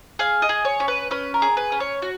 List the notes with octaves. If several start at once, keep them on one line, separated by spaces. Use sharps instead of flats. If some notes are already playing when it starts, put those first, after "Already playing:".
G#4 F5
D#5
G#4
C#5
C#4
B4
C#4 B4
A#4
G#4
B4
C#4
C#5
F#4